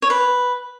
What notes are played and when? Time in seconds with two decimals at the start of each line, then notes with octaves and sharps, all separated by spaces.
0.02 C#5
0.10 B4